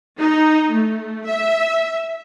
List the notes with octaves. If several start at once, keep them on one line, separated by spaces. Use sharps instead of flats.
D#4
A3
E5